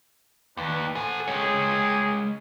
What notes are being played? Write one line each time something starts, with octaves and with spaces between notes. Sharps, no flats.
D#2 D4 B4
A3 A4 C5 F#5 G#5
G#3 A#3 G4 G#4 C#5